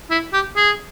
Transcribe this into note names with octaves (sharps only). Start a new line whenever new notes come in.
E4
G4
G#4